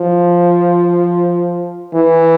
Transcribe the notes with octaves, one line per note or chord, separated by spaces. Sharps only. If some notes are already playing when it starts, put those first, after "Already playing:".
Already playing: F3
E3